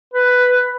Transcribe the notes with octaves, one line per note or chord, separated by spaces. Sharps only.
B4